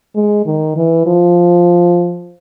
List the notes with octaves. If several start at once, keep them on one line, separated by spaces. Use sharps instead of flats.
G#3
D#3
E3
F3